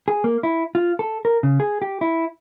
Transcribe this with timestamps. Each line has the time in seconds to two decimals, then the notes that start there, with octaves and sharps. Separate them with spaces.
0.08 G#4
0.24 A#3
0.43 E4
0.75 F4
0.99 A4
1.25 A#4
1.43 C#3
1.60 G#4
1.82 G4
2.01 E4